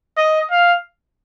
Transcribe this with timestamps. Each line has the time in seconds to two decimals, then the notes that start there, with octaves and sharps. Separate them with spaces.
0.17 D#5
0.51 F5